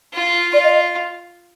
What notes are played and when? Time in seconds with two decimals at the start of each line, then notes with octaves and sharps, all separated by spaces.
0.13 F4
0.54 F4 D5
0.64 D#5